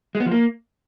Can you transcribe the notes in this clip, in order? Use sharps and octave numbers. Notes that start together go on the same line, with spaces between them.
G#3
B3
F3
A#3